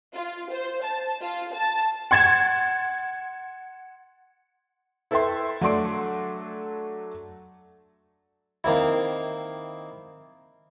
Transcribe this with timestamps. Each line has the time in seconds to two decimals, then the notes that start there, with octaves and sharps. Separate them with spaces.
0.13 F4
0.51 C5
0.83 A5
1.20 F4
1.52 A5
2.11 F#5 C6 G#6 A6 E7
5.11 E4 A4 B4 E5 G5 C6
5.61 F#3 A3 D4 C6 D7
8.64 D#3 A#3 C4 E4